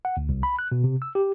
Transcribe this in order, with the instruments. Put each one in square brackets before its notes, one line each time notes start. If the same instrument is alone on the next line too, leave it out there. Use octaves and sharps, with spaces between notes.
[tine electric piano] F#5
D2
C2
B5
F#6
B2
C3
E6
G4